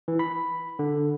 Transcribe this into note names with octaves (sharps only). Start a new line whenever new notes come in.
E3
B5
D3